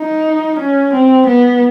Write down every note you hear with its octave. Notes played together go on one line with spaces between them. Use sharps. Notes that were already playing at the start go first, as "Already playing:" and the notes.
Already playing: D#4
C#4
C4
B3